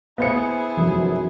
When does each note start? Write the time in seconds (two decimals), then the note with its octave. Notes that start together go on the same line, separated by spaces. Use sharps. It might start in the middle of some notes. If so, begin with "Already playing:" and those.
0.18 B3 E4 G#4 C5 C#7
0.77 F1 F#2